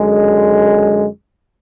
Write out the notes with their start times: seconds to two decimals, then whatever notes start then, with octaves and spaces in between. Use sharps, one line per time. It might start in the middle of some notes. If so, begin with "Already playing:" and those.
Already playing: F#2 D3 G#3